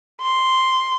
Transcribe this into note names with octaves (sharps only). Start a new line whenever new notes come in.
C6